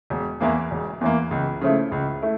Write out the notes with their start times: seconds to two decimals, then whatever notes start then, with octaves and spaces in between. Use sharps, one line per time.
0.10 E1
0.40 E2 E3 A#3
0.71 E1
1.01 E2 E3 A#3
1.31 C#2
1.61 C#3 F3 A3 E4
1.92 C#2
2.22 A3 E4